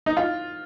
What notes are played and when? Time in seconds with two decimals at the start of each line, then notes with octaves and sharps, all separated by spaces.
0.06 D#4
0.17 F4